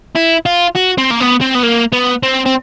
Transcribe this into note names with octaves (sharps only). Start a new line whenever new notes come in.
E4
F4
F#4
C4
A#3
B3
C4
B3
A#3
B3
C4
C4